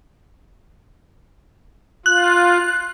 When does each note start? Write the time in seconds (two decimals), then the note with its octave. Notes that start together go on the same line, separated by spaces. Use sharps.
2.06 F4 F#6